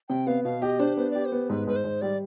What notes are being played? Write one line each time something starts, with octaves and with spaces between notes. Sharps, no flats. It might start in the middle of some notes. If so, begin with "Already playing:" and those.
C3 G5
B3 F5
B2 F5
G4 D#5
D4 C5
B3 C5
G4 D5
C5
B3
G#2 B4
G#2 B4
C5
G#2
G3 D5